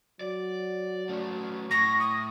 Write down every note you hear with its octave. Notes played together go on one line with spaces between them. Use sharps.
F#3 D5
A3 C#4
A2 C#6 A#6
D#6